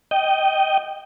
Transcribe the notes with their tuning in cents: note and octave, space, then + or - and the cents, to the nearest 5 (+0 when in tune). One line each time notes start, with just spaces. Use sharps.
D#5 +0 G5 -15